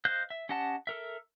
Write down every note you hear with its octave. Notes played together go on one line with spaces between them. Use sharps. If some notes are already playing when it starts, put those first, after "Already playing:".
C5 D#5 F5 F#6 G6
E5
C#4 G4 D#5 F#5 A5
A4 A#4 E5